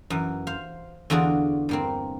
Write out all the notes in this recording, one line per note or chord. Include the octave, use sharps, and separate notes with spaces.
F#2 E3
C5 F5
E2 D3 F4 F#4 G#4 D5
G2 A#3 C4